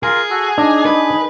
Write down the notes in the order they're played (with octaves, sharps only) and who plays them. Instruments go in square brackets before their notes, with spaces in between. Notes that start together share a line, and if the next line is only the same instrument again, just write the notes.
[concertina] F4 A#4 [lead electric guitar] G#4
[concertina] F#4 A4
[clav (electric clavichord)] D4 [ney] D#4 [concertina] A#5
[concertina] G#4 [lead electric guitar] B4